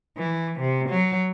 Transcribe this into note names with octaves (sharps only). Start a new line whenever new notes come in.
E3
C3
F#3